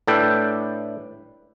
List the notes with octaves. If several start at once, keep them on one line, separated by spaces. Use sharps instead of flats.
A2 D4 A4 B4 G5